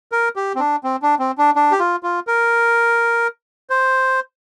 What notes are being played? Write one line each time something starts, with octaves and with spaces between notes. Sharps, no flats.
A#4
G4
C4
D4
C4
D4
C4
D4
D4
G4
F4
F4
A#4
C5